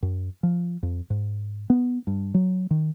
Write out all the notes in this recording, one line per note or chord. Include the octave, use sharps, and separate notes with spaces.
F#2
F3
F2
G#2
B3
G2
F#3
D#3